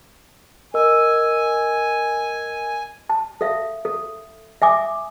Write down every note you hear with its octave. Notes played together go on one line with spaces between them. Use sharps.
A#4 D#5 G#5 E6
A5
A4 E5 F5
A4
E5 G#5 D6 D#6